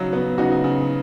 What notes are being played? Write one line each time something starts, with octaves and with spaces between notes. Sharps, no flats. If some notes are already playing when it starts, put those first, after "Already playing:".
Already playing: C#3 F#3 D#4 F#4
B3
C#3 D#4 F#4
C#3